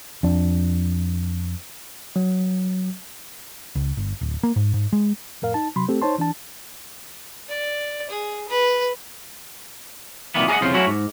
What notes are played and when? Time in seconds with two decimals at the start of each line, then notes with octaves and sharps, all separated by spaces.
0.23 F2 D4
2.16 F#3
3.75 C#2
3.97 G1
4.21 D1
4.43 A#3
4.56 G#2
4.74 G#2
4.93 G#3
5.42 F2 A2 A#4 F5
5.54 D#4 A5
5.76 C3 F#3 B5 C6
5.88 A3 C4 G4 A4
6.02 D#4 C5 C#5 A5 C6
6.18 E3 D4 A5
7.49 D5
8.10 G#4
8.48 B4
10.34 C2 A#2 D#3 E3 A#3 B3
10.48 G#4 A#4 D5 D#5 F#5
10.61 C2 F2 C#3 F4 C5
10.74 F#3 A3 C#4 E4 F#4
10.87 G#2